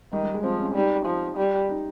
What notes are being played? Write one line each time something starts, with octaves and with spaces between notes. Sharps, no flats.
D#3 G3
G3
G#3
F3 C4
C#4
G3 D#4
F3
G3
D#4